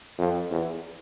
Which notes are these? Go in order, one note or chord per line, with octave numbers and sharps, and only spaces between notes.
F2
E2